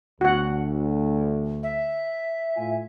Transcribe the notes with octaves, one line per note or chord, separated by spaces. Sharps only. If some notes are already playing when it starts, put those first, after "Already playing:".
D2 F#4 F#5
E5
A2 F4 G#5